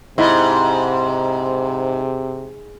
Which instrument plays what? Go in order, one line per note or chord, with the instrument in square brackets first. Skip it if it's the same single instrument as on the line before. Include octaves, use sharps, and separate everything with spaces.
[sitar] G#2 [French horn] C3 [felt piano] E4 D#5 B5